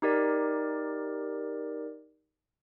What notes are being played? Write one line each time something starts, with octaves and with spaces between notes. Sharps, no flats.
D#4 G4 A#4 D5